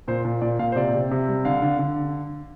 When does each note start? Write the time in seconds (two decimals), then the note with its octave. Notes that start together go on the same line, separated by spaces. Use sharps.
0.08 A#2 C5
0.25 A#2
0.42 A#2 D5
0.59 A#2 F5
0.72 C5
0.76 C3 D5
0.94 C3
1.11 C3
1.28 G3
1.45 D3 F5
1.62 D3
1.79 D3